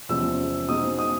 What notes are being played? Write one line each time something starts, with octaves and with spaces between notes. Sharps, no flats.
E2 C3 F3 G#3 C#4 E6
B2 G#3 C4 D#4 D#6
D#6